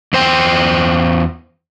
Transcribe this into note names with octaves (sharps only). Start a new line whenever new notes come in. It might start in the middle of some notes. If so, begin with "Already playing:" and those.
E2 C5 G5